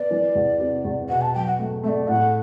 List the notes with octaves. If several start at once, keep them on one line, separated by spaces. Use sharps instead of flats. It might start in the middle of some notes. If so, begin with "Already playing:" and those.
Already playing: B3 D5
E3
E2
C3
E2
B2 F#5
A5
F#3 G5
F#5
A3
A3 E5
D5
A2 F#5